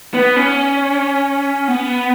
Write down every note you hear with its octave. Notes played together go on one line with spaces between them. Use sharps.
B3
C#4
B3